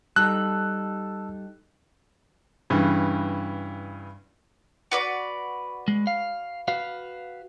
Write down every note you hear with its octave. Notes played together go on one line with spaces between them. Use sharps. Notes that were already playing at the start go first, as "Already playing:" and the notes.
G3 D#4 A4 A5 E6 F#6
G2 C#3 E3
F#4 B4 D5
G#3
F5
F#4 B4 F5